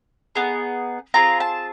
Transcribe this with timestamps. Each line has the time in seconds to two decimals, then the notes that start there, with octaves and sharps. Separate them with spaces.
0.35 B3 D#4 G#4
1.14 C4 F4 G#4 A#5
1.40 A5